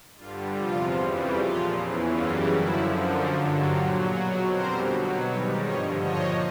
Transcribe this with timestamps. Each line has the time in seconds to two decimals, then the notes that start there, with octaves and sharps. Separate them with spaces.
0.17 G2 D3 G3 F4
0.56 E2 C3 F3 F4
0.95 F2 C#3 E3 G3
1.34 A#2 F3 F4
1.73 E2 C#3 E3
2.11 F#2 C#3 E3 G3 F4
2.50 F#2 D3 F3 E4
2.89 F#2 D3 F3
3.28 G2 D3 F#3 F4
3.67 A#2 F#3 F4 G4
4.06 B2 F#3 F#4 G#4
4.45 F2 D3 G3 A#4 C5
4.84 B2 F#3
5.22 G#2 D#3 G3 B4 C#5
5.62 G2 D3 F3 C#5 D#5
6.00 A#2 F3 C#5 D#5